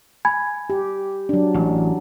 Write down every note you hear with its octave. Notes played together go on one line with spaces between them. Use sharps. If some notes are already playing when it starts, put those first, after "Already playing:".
G#5 B5 G#6
G4
F#3 D4
A1